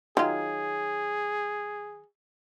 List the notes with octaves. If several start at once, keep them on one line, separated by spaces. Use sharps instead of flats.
D#3 F#3 F4 G#4